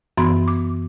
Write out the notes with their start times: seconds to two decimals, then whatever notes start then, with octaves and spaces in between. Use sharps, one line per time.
0.17 F#2 E3 B3 C6
0.48 D6